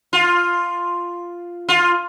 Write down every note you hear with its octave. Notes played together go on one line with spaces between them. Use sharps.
F4
F4